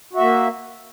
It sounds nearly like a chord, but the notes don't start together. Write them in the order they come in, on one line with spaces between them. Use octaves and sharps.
F#4 E5 A#3